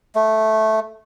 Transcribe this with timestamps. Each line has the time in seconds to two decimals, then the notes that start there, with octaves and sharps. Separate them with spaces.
0.15 A3